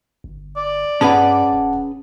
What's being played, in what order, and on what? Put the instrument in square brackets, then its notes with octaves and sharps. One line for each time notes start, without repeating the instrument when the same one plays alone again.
[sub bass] G1
[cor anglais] D5
[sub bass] G2 [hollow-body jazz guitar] C#4 G#4 B4 [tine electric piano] F#5 A5
[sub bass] D#1